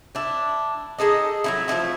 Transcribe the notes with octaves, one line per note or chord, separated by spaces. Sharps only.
D4 E4
D#4 G#4 A4 D#5
F#3 D#4 E4
F3 A3 D#4 E4